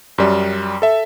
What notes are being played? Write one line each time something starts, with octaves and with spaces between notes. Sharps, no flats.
F#2 G3
A4 E5